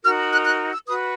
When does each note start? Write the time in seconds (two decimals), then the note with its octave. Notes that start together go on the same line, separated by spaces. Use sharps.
0.04 D#4 F#4 A#4 F6
0.32 F#6
0.46 F#6
0.74 E6
0.87 F#4 B4 D#6